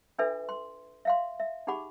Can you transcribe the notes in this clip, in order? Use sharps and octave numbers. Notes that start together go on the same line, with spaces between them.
D4 F4 A4 B4 E5 G#5
C6
E5 F5 C6
E5
D#4 G4 G#4 F#5 B5 D6